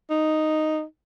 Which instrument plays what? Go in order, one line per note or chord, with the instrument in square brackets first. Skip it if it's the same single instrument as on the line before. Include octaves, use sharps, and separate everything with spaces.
[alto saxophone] D#4